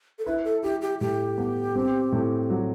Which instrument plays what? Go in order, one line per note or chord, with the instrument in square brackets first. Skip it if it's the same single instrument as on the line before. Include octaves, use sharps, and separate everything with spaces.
[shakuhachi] A4
[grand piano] E4 [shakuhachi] B4
[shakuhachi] A4
[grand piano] E4 [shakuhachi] G4
[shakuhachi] G4
[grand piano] A2 [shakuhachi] G4
[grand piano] B3
C4
A2
F#3